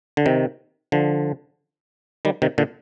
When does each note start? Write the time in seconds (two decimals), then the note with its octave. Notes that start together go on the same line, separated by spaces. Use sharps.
0.17 D3
0.26 C3 D#3
0.92 D3 F3
2.25 D#3 G3
2.42 C3 D#3
2.58 A#2 D3